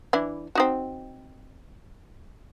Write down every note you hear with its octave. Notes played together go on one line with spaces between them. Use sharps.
E3 D4 E4
C4 D#4 F#4